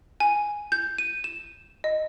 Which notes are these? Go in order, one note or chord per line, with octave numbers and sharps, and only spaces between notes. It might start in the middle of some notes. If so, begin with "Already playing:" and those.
G#5
G6
D#7
E7
D#5